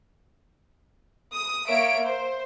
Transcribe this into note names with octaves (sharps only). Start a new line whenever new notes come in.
D#6
A#3 C#5 E5 D7
C5